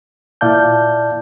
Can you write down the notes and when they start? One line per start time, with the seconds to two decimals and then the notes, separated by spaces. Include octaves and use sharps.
0.41 A#2 E4 D5 F5 A5 G6